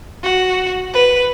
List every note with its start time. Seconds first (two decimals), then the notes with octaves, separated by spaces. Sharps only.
0.23 F#4
0.93 B4